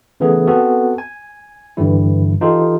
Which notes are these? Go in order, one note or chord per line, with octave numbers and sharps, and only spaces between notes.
C#3 E3 A3 B3 G#4 A4
B3 C4 F#4 A4
G#5
G2 D3 E3 G3 E4
E3 D#4 F4 G4 A4